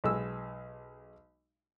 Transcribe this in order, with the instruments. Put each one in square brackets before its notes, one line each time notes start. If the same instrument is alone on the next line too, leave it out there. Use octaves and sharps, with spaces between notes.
[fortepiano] B1 G#3 E6